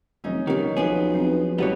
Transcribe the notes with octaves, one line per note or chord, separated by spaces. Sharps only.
F1 D#3 F#3 C4 C#4 D#4
C#2 B2 D#3 G4 A#4
B1 F3 B3 G#4
F#3 C4 D4
A1 G2 B2 F#3 G3 B4 C#5